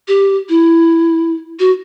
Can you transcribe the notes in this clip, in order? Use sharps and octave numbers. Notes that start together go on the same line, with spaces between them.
G4
E4
F#4